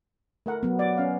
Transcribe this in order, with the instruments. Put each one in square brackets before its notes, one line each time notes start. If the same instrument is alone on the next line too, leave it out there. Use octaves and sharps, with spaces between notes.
[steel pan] A3 A#4 F#5
[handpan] F#3 B3
[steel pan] D5
C#4 F5